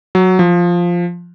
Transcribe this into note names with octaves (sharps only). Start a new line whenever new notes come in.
F#3
F3